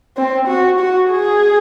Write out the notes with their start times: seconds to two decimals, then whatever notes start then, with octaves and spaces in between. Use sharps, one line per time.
0.17 C4
0.48 F#4
0.79 F#4
1.11 G#4